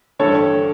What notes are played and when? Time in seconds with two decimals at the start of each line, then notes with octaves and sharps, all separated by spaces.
0.19 A1 G2 D3 A4 C#5